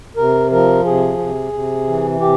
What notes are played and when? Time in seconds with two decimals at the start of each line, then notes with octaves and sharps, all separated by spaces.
0.17 C3 A#4
0.51 F3 A#4
0.84 C3 G#4
1.18 C3
1.53 C3
1.87 E3
2.21 C3 G4